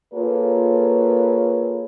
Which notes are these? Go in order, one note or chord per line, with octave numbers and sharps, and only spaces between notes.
A#3 F4 G#4 A4 B4 C#5